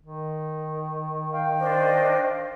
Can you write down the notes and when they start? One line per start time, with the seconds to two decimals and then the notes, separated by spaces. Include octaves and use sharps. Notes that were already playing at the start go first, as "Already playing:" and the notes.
0.03 D#3
1.33 F5 G5
1.59 D4 C5 D#5